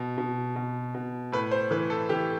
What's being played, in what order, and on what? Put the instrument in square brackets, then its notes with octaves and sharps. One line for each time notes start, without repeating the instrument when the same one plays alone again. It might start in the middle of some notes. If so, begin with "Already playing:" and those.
Already playing: [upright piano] B2
B2
B2
B2
A2 B4
C5
E3 B4
A4
E3 G4